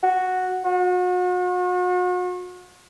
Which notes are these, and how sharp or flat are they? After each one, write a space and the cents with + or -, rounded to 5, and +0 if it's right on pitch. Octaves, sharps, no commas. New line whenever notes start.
F#4 -5
F#4 -40